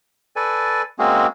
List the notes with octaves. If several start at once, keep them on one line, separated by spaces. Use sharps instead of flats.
A4 B4 D5 G#5
G#3 A#3 C4 C#4 F#4 G#4